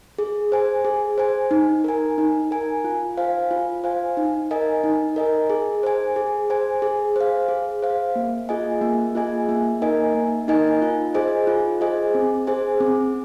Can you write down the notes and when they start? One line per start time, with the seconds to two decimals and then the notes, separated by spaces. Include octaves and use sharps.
0.18 G#4
0.52 C5 G#5
0.85 G#4
1.18 C5 G#5
1.51 D#4
1.84 A#4 G#5
2.18 D#4
2.51 A#4 G#5
2.84 F4
3.17 C5 F5 G#5
3.51 F4
3.84 C5 F5 G#5
4.17 D#4
4.51 A#4 D#5 G#5
4.84 D#4
5.16 A#4 D#5 G#5
5.50 G#4
5.83 C5 G#5
6.16 G#4
6.50 C5 G#5
6.82 G#4
7.16 C5 F5
7.49 G#4
7.82 C5 F5
8.16 A#3
8.49 F4 G#4 D#5 G#5
8.81 A#3
9.15 F4 G#4 D#5 G#5
9.49 A#3
9.81 D#4 A#4 D#5 G#5
10.15 A#3
10.48 D#4 A#4 D#5 G#5
10.82 F4
11.14 G#4 C5 D#5 G#5
11.47 F4
11.81 G#4 C5 D#5 G#5
12.15 C4
12.47 G#4 C5 G#5
12.80 C4